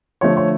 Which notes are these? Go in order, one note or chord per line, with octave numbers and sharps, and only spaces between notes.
D3 F3 A3 C#5
C#5